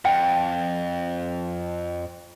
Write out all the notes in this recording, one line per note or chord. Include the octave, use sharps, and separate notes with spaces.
F2 G5